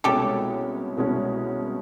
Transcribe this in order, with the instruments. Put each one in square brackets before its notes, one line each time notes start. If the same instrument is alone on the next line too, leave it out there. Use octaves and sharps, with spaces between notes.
[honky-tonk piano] C2 B2 G#3 C#4 [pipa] G4 A4
[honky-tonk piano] C2 B2 G#3 C#4